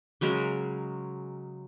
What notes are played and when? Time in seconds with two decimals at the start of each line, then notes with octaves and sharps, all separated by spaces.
0.21 C#3 F#3 G#3 A#4